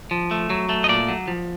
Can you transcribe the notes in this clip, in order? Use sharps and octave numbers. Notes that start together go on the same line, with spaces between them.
F3
A3
F#3
A3
D#5
A#2 D5
F#3
F3